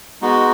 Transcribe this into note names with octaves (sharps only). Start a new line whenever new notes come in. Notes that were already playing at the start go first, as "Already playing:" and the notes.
G#3 B3 D#4 F#4